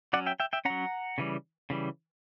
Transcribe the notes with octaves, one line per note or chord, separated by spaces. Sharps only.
F#3 C#4 D5 F#5
E5 G5
E5 G5
E5 G5
F#3 C#4 F#5 A#5
C#3 E3 G3
C#3 E3 G3